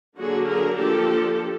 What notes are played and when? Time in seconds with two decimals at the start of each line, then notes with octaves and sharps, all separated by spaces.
0.18 D3 F#3 A#3 D4 F#4 G#4
0.47 G#4 A#4
0.77 F3 A#3 D4 G4 A4